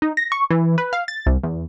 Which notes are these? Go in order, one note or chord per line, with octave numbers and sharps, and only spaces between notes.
D#4
A#6
C#6
E3
B4
F5
A6
C2
E2